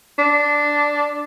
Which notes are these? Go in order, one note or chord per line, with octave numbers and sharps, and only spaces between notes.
D4